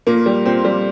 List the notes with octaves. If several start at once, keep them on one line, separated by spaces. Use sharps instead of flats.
A#2 A#3
G3
A#2 C4
G3